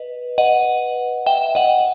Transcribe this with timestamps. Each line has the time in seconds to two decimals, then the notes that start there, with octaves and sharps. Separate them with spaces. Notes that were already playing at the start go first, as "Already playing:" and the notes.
Already playing: B4 D#5
0.38 D#5 F#5
1.26 E5 G5
1.55 D#5 F#5